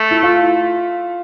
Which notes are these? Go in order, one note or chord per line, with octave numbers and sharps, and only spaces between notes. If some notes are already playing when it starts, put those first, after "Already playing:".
Already playing: A3
E4
F4